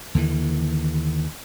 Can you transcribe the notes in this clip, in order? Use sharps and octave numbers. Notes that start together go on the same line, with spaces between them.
D#2 D3 E3